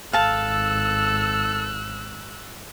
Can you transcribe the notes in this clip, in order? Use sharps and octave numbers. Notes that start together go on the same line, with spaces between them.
G#1 A4 F5 A5 E6 F#6